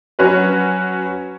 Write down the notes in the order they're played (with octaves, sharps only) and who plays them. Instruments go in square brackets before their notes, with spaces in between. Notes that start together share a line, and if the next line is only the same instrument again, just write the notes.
[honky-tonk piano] F#3 C#4 F#4 B4